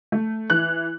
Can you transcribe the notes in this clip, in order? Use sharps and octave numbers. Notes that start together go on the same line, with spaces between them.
A3
E3 F#6